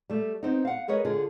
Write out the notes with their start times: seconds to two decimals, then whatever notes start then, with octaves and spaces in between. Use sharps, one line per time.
0.10 G3 A3
0.43 B3 C4 D#4
0.65 F5 F#5
0.88 G#4 A#4 B4 C#5 D#5
1.05 D3 F4 G#4